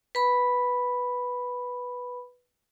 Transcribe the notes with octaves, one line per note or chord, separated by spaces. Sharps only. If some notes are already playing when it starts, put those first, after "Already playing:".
B4 B5